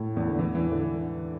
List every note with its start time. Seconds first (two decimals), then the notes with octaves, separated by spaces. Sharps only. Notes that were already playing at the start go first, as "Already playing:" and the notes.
Already playing: A2
0.17 E2
0.28 D3
0.39 E3
0.55 E3
0.71 D3